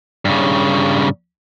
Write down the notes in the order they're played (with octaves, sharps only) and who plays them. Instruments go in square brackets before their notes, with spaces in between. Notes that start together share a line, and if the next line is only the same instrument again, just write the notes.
[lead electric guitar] G2 C#3